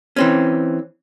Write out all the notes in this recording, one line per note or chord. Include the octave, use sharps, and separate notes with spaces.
E3 C4 C#4